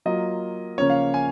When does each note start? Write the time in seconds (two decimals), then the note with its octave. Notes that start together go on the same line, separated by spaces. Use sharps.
0.05 F#3 A#3 F4 D#5
0.78 C#3 F3 A#3 C#4 C#5
0.90 F5
1.14 G#5